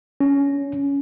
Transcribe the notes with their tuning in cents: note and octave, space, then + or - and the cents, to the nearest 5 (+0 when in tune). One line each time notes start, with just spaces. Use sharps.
C#4 +20